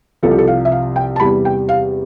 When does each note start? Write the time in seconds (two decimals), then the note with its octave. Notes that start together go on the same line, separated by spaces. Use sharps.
0.23 C2 C3 F3 A4
0.31 G4
0.38 A4
0.48 F5
0.65 E5
0.72 F5
0.96 G5
1.16 A5
1.20 E2 C3 G3 B5
1.45 G5
1.69 F5